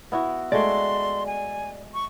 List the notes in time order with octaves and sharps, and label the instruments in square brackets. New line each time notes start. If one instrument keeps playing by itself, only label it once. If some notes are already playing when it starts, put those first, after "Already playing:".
[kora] B3 E4 F#4
[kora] G#3 A3 F#4 [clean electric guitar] D5 [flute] C6
[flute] G#5
C#6